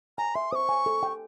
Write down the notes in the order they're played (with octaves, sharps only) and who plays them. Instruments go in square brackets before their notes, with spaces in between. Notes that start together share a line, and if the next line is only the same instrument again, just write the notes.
[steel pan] G#5 [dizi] A#5
[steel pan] E5 [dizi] C6
[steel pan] C5 [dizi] C#6 D#6
[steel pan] G#5
A4
G5